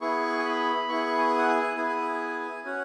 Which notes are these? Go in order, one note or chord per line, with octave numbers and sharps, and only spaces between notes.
B3 E4 G#4 C#6
G#5
B5
B3 E4 G#4 C#6
G#5
F#5
G#5
B3 E4 G#4
C#4 F#4 G#5